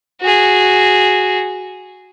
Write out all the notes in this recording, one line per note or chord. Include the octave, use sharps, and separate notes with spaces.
F#4 G#4